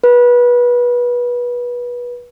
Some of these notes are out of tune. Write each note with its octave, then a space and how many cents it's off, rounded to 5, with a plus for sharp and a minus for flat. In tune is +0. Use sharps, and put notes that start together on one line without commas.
B4 -25